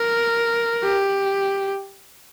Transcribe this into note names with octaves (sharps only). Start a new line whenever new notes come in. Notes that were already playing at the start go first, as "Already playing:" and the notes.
Already playing: A#4
G4